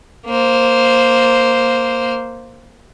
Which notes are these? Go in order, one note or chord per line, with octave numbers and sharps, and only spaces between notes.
A#3 C5